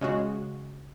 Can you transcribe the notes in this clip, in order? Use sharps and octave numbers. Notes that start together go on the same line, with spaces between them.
C#3 G#3 F#4